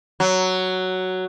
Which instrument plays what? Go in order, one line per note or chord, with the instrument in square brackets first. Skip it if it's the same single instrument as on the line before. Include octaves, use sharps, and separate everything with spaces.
[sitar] F#3